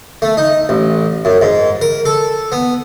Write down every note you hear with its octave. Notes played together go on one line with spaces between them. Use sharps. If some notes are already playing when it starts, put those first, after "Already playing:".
A3
D#4
A1
F#2
G#2
A#4
A4
B3